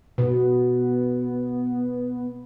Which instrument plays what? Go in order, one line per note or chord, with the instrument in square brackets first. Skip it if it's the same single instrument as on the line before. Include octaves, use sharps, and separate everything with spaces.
[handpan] B2 [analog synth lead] B3